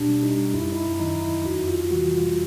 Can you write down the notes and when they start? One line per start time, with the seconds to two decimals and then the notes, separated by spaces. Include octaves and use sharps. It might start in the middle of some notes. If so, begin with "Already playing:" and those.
Already playing: B2 D4 G4
0.09 G3
0.23 D#4
0.54 F#2 E4
0.72 D#4
0.76 E4
1.00 D#3 F#3 D#4
1.22 E4
1.45 F2 F#4
1.68 F4
1.90 C3 E3 G3 F#4
2.14 F4